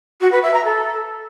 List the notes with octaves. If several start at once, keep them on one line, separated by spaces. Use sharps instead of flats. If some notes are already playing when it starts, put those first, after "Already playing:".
F#4
B4
E5
A#5
A4